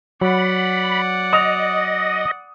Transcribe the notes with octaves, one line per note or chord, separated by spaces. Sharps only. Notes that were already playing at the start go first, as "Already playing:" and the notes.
F#3 D5 F#5 B5
D#5 D#6 F7